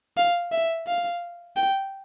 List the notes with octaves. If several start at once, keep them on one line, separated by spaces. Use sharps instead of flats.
F5
E5
F5
G5